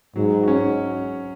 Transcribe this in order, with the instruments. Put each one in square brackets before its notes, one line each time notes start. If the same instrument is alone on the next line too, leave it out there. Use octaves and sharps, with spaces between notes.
[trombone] G#2 [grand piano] F#3
[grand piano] C#4 F#4